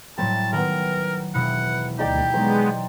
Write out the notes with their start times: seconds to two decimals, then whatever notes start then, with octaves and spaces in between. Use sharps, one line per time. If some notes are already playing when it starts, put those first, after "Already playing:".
0.18 A2 F#3 G3 C4 A5
0.53 D#3 B3 A#4 A#5 B5
1.34 E1 B2 E4 F#5
1.99 D2 D#4 G4 D5 G5
2.34 F#3 G#3 B3 D#4 C5